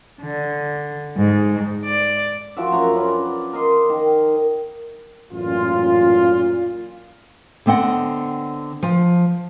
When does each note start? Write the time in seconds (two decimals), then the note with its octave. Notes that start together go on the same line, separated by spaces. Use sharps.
0.21 D3
1.16 G#2
1.84 D5
2.56 F3 F#4 E5
2.72 F#2 F#4 G#5 A#5
2.95 C#4 D4 F4 B4
3.53 A#4 D#5 C6 D6
3.90 D#3
5.32 A1 F#2 A#2 F4
7.66 D3 B3 C4 D#5 F#5
8.83 F3